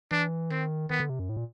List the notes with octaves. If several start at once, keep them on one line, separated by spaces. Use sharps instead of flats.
E3 D4
D#3 C4
D#3 B3
D3
C3
F#2
A2
A#2